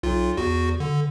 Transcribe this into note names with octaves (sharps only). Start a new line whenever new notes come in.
B1 F4
E2 F#4
D3